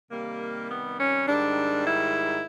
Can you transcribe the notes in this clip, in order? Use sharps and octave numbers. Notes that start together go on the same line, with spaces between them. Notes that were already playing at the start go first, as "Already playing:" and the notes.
C3 D#3 G3 A#3
B3
C#4
G#2 D#3 G3 D4
E4